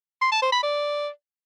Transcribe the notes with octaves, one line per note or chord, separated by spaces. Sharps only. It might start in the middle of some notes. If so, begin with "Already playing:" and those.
C6
A5
C5
B5
D5